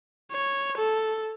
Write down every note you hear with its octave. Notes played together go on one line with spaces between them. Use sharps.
C#5
A4